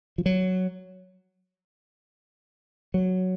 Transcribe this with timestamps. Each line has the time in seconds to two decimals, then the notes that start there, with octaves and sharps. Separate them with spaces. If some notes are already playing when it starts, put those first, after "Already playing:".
0.18 F3
0.26 F#3
2.94 F#3